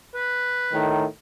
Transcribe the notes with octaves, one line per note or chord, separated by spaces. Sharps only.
B4
A2 D#3